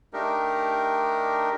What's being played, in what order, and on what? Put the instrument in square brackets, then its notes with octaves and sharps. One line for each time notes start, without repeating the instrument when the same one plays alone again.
[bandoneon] A3 D4 D#4 G4 A#4